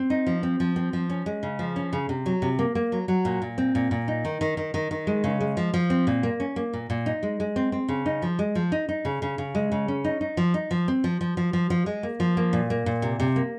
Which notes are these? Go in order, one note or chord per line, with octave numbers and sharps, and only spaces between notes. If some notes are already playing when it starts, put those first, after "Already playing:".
Already playing: C4
D#4
F3
C4
F3
C4
F3
C#4
G#3
C#3
F3
C#4
C#3
C3
F#3
C3
A#3
A#3
F#3
F#3
A#2
A#2
C4
A#2
A#2
D#4
D#3
D#3
D#3
D#3
D#3
G#3
C#3
G#3
F3
F3
C4
A#2
A#3
C#4
A#3
A#2
A#2
D#4
G#3
G#3
C4
C4
C#3
D#4
F3
G#3
F3
D#4
D#4
C#3
C#3
C#3
G#3
C#3
C#4
D#4
D#4
F3
D#4
F3
C4
F3
F3
F3
F3
F3
G#3
A#3
F3
A#3
A#2
A#3
A#2
C3
C3
A#3